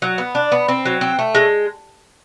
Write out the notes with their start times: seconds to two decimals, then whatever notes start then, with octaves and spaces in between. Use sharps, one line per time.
0.02 F#3
0.18 B3
0.35 D4
0.52 B3
0.68 C4
0.85 F#3
1.01 C4
1.19 A3
1.35 G#3